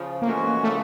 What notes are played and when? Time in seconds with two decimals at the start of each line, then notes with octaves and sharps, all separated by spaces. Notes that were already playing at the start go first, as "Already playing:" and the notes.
Already playing: C#3 F3
0.22 A#3
0.27 E3 G#3 A3 C#4 F#4
0.63 C#3 A3